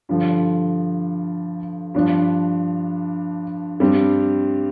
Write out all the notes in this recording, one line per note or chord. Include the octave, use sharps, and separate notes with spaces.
G2 D3 F3
G2 F3 D4
G2 G3 C4